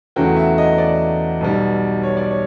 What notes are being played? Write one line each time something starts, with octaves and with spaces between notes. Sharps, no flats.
E2 C#3 F#3 A3 G5
E5
D#5
D5
B1 B2 G3
C#5
D5
C#5